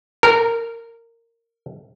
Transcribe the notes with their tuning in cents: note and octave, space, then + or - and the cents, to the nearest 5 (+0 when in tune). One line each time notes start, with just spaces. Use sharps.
A#4 -15